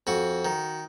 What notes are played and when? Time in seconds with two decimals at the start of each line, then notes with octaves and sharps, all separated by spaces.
0.07 F2 F#4
0.45 D#3